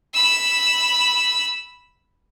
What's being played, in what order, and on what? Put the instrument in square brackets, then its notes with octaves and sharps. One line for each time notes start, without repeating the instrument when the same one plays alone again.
[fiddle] B5 E6